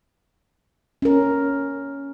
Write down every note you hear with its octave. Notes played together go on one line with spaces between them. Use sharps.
C#4 A#4